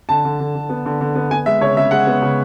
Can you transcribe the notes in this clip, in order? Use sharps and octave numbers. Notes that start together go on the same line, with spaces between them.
D3 A5
D3
D3
D3
B3
D3
D3
B3
B3 G#5
G#3 E5
C#3 C#5
C#3 E5
G#3 F#5
B3
C#3